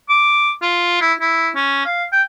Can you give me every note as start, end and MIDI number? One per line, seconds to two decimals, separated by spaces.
0.09 0.52 86
0.62 0.97 65
1.01 1.13 64
1.21 1.50 64
1.55 1.82 61
1.86 2.04 77
2.12 2.22 79